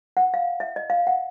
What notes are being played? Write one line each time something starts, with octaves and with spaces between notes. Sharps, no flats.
F#5
F5
E5
D#5
F5
F#5